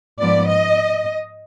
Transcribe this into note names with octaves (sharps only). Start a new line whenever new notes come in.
G#2 F3 B3 D5
D#5